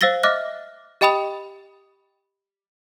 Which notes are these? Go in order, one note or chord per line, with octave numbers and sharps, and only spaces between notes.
C5 F5 E6 A6 A#6 G7
D#5 E5 D6 F6 F#6 A#6
G4 D#5 G5 B5 D#6 F7